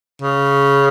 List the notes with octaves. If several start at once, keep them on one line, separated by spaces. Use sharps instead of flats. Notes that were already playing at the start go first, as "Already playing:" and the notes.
C#3